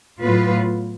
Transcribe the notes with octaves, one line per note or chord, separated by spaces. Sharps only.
A2 F#3 B3 F4 B4